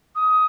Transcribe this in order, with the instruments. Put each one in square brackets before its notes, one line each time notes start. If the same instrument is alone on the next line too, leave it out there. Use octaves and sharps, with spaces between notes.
[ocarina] D#6